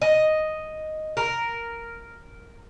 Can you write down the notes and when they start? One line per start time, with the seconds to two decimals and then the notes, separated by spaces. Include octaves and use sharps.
0.02 D#5
1.17 A#4